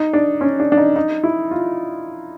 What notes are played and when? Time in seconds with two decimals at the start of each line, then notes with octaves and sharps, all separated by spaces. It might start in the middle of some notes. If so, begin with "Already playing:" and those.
Already playing: D#4
0.13 D4
0.41 C#4
0.60 D4
0.72 D4
0.78 D#4
0.96 D#4
1.24 E4
1.51 F4